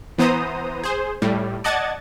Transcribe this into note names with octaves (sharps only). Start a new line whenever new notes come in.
E3 B3 C5 A#5 D#6
G#4 C5
A2 G3
D5 D#5 F#5 A5 G#6 A6